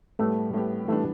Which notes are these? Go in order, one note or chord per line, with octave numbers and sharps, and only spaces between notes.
A2 G3 A3 B3 G4
A2 G3 A3 B3 G4
E3 G3 A3 B3 D4